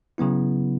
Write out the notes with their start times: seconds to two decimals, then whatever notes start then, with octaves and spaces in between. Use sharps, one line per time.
0.18 C#3 F#3 B3 E4